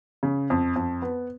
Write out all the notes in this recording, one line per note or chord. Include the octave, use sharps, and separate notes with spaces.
C#3
F2
F2
B3